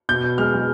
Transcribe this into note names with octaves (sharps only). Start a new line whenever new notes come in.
B2 G6
B2
G#3 F6
G#3